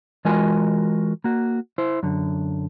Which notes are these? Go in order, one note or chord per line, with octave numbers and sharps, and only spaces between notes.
E3 G#3 F4 F#4 A#4 G#5
A#3 F#4
E4 C5
F#2 D3